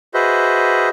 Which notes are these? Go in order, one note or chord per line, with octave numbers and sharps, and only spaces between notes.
F#4 G#4 B4 C5 D#5 E5